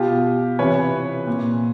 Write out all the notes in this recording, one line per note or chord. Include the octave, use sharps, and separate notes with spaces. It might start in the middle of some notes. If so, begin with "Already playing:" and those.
Already playing: B2 F4 G4
C3 E3 B4 C#5
A#2